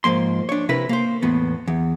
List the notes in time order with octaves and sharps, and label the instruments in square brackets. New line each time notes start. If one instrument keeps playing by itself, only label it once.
[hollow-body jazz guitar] G#2 F3 A#3 C6
D4 C#5
C3 E4 A#4 B4
A#3 C5
E2 A2 B3
E2